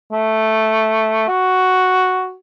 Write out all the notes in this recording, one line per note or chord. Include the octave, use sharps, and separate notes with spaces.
A3
F#4